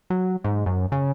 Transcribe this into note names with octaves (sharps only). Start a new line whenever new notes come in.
F#3
G#2
F#2
C#3